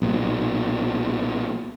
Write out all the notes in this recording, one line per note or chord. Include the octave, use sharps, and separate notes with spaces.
B1 A#2